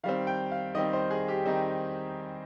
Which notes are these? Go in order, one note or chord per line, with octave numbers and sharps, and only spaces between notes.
D#3 G3 C4 F5
G5
F5
D#3 G3 C4 D#5
C5
G#4
G4
D#3 G3 C4 D#4